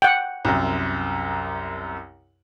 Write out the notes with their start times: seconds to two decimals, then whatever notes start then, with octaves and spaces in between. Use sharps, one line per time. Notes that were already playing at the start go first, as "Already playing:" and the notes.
0.02 F#5 G5
0.45 C2 F#2